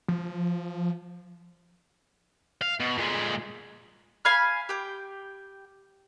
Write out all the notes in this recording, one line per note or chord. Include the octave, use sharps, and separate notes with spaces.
F3
F5
B2
A#2 G#3
F5 G#5 B5 F6
G4 G5